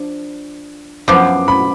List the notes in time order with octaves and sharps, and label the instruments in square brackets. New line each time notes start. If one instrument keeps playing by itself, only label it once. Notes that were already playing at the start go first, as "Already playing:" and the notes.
Already playing: [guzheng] F3 D4
[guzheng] F#2 F3 B3 [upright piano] D6
[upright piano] B5